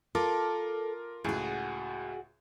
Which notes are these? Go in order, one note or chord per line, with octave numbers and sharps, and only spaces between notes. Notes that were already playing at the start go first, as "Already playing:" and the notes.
F4 A4 A#4 D6
C#2 A2 F#4 G#4